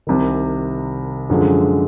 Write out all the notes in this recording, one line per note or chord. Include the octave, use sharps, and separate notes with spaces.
C2 C3 D#3
F#2 D3 F3 G#3